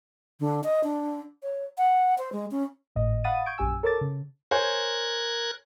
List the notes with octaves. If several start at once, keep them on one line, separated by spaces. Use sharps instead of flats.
D3
D#5
D4
C#5
F#5
C5
G#3
C#4
G#1 A2 D#5
F5 F#5 B5 D#6 A6 D#7
C#6 G6 G#6 D7
A#1 F#2 G4 G#5 E6
A4 A#4 C#5 A5 D6 A6
C#3
A#4 C5 C#5 G#5 F#6 G#6